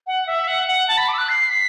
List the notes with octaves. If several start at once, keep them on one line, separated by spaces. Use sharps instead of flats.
F#5
E5
F#5
F#5
A5
B5
D6
E6
F#6
C7
B6